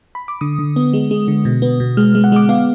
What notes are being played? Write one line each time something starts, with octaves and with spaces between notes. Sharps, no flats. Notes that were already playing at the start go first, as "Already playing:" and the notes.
B5
D6
D3 D#6
D3
B3
G#3
G#3
D3
B2
B3
B2
G#3 F6
G#3
F#5
G#3 D6
B3 F5